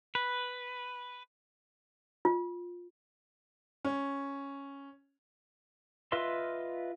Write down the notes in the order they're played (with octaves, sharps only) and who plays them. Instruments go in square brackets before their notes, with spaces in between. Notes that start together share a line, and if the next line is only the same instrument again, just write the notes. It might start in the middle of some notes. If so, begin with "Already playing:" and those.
[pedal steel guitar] B4
[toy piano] F4
[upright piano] C#4
[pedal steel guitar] F4 B4 D#5 E5 C6